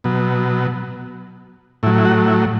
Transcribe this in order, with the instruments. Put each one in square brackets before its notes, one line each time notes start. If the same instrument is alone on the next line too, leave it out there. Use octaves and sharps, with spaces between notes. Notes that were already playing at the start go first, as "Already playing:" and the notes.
[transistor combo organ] B2 F#3
A2 E4
F#3
E4
F#4
E4